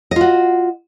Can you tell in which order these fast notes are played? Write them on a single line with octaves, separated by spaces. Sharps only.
D#5 F4 F#4